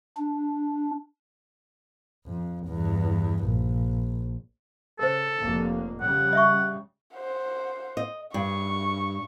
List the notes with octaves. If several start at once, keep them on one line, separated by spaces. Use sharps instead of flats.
D4
F2
E2 G2
A#1
C#3 A4 A#4 C5
F1 A#3
C#3 G3 F#5
D#5 E5 C#6
C5 F#5
D#5
G2 C#6